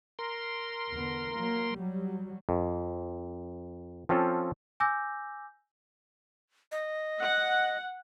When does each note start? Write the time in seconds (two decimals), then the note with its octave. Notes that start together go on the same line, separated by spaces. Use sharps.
0.19 A#4 C6
0.91 E2 D3 B3
1.34 F#3 A#3
1.75 F#3 G3
2.49 F2
4.09 F3 C4 C#4 F4 A4
4.80 G#5 D6 E6 G6 A#6
6.72 D#5
7.22 F#5